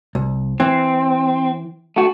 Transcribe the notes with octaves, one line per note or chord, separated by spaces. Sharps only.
C2
E3 C4
A3 F#4